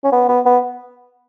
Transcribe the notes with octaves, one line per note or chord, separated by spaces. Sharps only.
C#4
B3
B3
B3